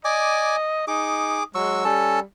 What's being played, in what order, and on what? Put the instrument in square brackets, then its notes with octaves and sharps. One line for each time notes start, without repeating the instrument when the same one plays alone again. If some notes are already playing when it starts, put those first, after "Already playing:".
[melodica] D5 G#5 D6 [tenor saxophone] D#5
[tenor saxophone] D#4 [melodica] G#4 D6
[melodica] F#3 C#6 E6 [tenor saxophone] G#3
[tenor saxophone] G3 [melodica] C#4 A4 A5